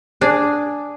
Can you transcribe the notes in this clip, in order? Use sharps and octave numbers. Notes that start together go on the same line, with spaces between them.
D4 G#4